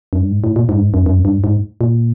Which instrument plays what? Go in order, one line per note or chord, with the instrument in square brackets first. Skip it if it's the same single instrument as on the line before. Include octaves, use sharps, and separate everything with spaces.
[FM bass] F#2
G2
G#2
A2
A#2
G#2
G2
G#2
F#2
F#2
G2
G#2
A#2